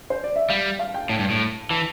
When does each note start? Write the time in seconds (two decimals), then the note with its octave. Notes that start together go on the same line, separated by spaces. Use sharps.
0.10 C5
0.24 D5
0.36 E5
0.49 G3 F5
0.79 F5
0.94 G5
1.09 A2 A5
1.19 G2
1.30 A2
1.70 E3 A5